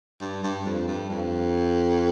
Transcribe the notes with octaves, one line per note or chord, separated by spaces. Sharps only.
G2
G2
F2
G2
F2